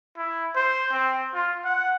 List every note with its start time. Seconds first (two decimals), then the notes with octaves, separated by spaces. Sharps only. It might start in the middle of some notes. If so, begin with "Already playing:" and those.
0.17 E4
0.55 C5
0.91 C4
1.34 F4
1.65 F#5